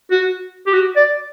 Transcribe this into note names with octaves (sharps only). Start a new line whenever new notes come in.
F#4
G4
F#4
D5